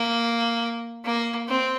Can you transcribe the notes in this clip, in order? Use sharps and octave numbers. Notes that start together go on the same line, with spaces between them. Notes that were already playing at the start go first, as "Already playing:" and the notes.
Already playing: A#3
A#3
C4